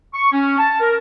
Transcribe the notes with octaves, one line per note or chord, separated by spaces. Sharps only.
C#6
C#4
A5
A#4